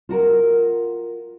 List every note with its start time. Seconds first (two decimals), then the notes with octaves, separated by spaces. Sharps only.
0.09 F4 F#4 A#4